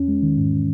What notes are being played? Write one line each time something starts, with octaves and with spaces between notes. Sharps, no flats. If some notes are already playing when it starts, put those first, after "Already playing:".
Already playing: E2 C#4
G#3
D#3
G#2